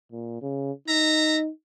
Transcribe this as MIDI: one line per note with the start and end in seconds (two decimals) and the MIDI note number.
0.12 0.40 46
0.42 0.72 49
0.88 1.50 63
0.88 1.36 76
0.88 1.36 82